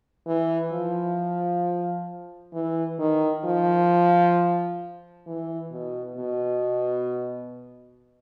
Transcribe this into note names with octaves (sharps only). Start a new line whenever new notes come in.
E3
F3
E3
D#3
F3
E3
B2
B2